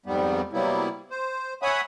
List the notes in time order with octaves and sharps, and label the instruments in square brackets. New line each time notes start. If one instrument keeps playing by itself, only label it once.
[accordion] F2 G#2 G3 B3
C3 F#3 G3 A#3 B3 E4
C5
C#5 E5 F#5 G#5 B5 D#6